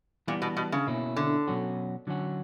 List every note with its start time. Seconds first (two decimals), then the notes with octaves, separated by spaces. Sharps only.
0.28 A#2 E3 G3 B3
0.42 B2
0.57 B2
0.72 C#3
0.87 B2 A#3 C#4 E4
1.16 D3
1.48 B2 F#3 C#4 F#4
2.07 D3 F#3 C#4 F#4